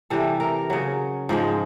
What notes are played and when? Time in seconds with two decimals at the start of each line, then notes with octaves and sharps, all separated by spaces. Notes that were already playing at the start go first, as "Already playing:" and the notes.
0.10 C3 E3 G3 A4
0.40 A#4
0.70 C#3 F#3
1.29 G#2 F3 G#3